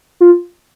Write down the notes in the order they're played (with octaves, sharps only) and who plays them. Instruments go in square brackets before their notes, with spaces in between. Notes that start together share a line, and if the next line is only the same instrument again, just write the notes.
[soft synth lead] F4